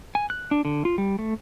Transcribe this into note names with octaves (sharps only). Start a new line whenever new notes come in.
G#5
F#6
D4
D3
F4
G3
A3